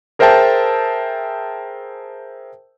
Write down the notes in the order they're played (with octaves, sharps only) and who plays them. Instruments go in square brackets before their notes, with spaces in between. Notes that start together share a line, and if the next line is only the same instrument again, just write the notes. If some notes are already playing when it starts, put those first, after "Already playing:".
[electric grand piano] G#4 A#4 C5 E5 G5 A5